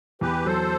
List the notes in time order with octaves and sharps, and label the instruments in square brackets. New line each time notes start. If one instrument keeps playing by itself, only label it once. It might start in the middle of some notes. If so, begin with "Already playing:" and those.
[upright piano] E2 [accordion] G4 B4
[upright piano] F#3 [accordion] A4 C5